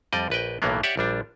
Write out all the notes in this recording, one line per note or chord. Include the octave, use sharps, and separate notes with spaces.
F2 G3 D5 D#5
A#1 B4 D#5 G5
B1 A2 E3 F#3 A#3 B3
G4 C#5 D5 E5 F#5
A#1 G3 D4